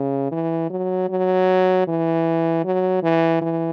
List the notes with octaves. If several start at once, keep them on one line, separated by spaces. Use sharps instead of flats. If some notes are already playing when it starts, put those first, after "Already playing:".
Already playing: C#3
E3
F#3
F#3
E3
F#3
E3
E3